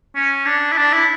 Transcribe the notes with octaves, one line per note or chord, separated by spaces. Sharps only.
C#4
D4
E4
D4
E4